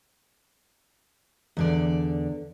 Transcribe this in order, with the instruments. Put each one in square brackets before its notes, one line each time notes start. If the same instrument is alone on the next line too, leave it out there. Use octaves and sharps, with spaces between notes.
[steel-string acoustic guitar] E2 D3 D5